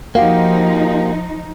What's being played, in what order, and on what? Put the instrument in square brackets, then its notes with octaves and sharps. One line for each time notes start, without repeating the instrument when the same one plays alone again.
[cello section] F3 D#4 [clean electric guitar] A#3 F#4 G4 [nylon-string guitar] F5